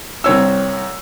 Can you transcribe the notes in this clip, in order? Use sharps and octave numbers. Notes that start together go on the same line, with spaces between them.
C2 C4 C#5 E6